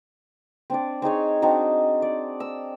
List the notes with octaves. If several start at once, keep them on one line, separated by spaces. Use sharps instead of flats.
C4 D4 D5
C4 D#4 G#4 C#5
C4 D4 D#4 F#4
D5
A#5 E6